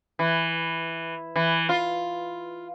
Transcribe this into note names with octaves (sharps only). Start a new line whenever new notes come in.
E3
E3
F4